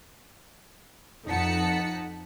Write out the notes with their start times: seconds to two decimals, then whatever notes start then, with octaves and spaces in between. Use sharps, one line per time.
1.27 F2 D#4 F#5 A5 B6 C#7